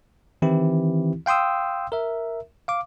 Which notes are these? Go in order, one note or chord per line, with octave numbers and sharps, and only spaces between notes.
D#3 E3 C4 E4 G4
F5 G5 C6 D#6 E6
A#4 E5
F5 D6